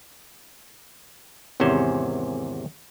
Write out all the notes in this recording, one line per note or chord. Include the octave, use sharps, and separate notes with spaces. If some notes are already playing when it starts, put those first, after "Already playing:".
G#1 E2 C3 C#4 C5